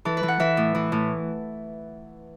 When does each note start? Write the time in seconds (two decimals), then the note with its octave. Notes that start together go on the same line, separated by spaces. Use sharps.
0.05 E3 A4
0.17 B4
0.23 E3
0.28 F#5
0.40 E3 E5
0.57 A2
0.75 E3
0.92 A2